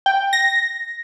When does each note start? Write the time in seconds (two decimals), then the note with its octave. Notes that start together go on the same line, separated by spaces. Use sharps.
0.06 G5
0.33 A#6